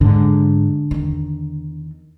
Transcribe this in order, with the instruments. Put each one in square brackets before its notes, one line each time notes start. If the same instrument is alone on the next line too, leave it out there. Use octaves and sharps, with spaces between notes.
[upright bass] G#2 [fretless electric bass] D3
[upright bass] E2 D#3